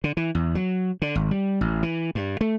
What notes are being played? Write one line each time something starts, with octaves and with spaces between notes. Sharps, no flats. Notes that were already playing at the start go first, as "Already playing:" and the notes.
D3
E3
E2
F#3
D3
G#1
G3
A1
E3
G2
A3